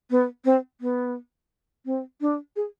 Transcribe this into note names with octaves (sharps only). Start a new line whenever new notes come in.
B3
C4
B3
C4
D4
G#4